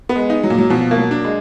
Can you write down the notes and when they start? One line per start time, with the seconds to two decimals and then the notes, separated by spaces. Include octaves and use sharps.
0.09 B3
0.16 G#3
0.30 D#4
0.43 F#3
0.50 A#2
0.58 F#3
0.70 B2 F3
0.91 A#3
0.97 F#3
1.11 D4
1.24 G#3